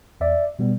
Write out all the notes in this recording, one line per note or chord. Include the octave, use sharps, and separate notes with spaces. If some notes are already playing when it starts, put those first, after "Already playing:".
E2 D5 E5
B2 G3 B3